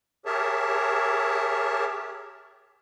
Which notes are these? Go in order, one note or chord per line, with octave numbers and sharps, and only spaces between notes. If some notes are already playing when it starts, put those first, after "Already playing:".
G4 G#4 A#4 C#5 E5 A5